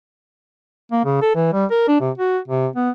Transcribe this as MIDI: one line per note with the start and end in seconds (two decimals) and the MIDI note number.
0.92 1.04 58
1.05 1.21 49
1.22 1.32 69
1.36 1.53 52
1.54 1.66 55
1.71 1.87 70
1.88 1.99 62
2.01 2.11 48
2.18 2.38 66
2.48 2.68 48
2.76 2.90 59